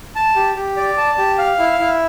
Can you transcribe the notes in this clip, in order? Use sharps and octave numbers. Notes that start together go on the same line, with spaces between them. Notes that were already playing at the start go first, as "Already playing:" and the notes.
A5
G4
G4
D5
A5
G4
F5
E4
E4